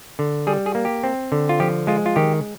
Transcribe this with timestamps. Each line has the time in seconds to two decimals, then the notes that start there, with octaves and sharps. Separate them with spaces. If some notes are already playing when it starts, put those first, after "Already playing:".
0.19 D3
0.47 G3 G#4
0.66 G#4
0.75 A#3
0.85 G4
1.03 C4
1.32 D3
1.49 F4
1.60 F3 G4
1.87 G#3 F4
2.06 F4
2.16 D#3 G4